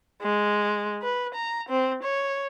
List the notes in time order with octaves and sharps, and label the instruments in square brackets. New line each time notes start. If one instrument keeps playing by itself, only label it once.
[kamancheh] G#3
B4
A#5
C4
C#5